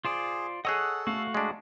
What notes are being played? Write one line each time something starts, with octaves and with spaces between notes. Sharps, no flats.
F4 G#4 C5 D5
G#4 A4 C#5 D#5 F#5 E6 F#6
A3 F#4 F5
G#3 D4